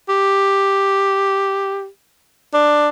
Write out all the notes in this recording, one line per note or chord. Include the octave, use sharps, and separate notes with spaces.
G4
D4